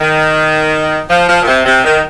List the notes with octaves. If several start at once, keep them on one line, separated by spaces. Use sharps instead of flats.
D#3
F3
F3
A#2
C3
C3
D#3